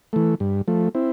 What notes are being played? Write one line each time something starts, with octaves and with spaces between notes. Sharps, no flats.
E3 A3
G2
F3 A3
C4 E4